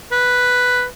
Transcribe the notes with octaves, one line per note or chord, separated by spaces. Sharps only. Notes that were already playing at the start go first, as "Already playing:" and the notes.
B4